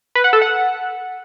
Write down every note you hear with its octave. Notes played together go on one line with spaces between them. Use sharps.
B4
F#5
A4
F#5